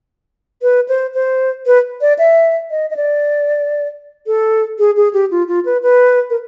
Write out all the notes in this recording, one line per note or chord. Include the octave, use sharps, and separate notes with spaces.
B4
C5
C5
B4
D5
E5
D#5
D#5
D5
A4
G#4
G#4
G4
F4
F4
B4
B4
A#4